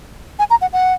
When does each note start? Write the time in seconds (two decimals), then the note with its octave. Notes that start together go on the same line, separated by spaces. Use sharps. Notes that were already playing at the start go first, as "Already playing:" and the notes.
0.39 G#5
0.50 A#5
0.62 F#5
0.73 F#5